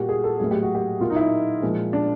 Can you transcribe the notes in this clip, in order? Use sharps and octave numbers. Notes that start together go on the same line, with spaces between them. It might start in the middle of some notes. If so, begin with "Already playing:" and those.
Already playing: A#2 G3 A#3 F#4 G4
G#4
A4
A2 F#3 A#3 G#4
G4
F#4
G4
A#2 F#3 A#3 F4
D#4
E4
A#2 F3 G#3
D4